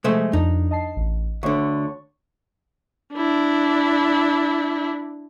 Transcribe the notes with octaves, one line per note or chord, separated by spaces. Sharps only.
C3 F3 G#3 A3 C5
F2 D4 D#4
D#5 A5 C7
A1
D2 D3 C#5 C#6
D4 E4